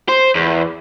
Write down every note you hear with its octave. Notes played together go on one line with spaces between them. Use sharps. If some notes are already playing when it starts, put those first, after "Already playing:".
C5
E2